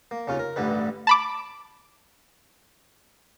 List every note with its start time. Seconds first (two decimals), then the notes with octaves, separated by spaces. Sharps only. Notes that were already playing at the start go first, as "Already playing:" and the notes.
0.11 A#3
0.27 D#2 C#3 C#4 F4
0.39 A#4
0.56 A1 G2 D3 G3 B4
1.07 A5 B5 D6